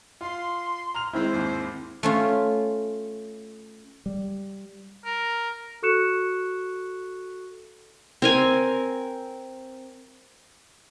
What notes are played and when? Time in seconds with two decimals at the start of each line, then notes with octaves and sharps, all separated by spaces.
0.21 F4 F5 C6
0.94 A#5 F6 F7
1.13 D#3 G#3 C4 E4 C5
1.33 D#2 G#2
2.03 A3 C#4 F4
4.06 G3
5.05 A#4
5.82 F#4 A4 C#6 F#6 C#7 E7
8.22 C4 A#4 G#5